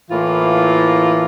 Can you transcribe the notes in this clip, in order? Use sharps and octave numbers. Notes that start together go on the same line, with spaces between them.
A2 E3 A#3 F4